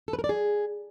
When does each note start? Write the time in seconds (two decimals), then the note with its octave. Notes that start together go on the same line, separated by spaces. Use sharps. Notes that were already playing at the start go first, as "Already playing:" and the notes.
0.08 A4
0.13 B4
0.19 A#4
0.24 D5
0.29 G#4